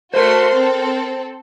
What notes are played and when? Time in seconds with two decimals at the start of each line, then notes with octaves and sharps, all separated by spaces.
0.14 A3 F#4 A#4 C5 C6
0.54 C4 A4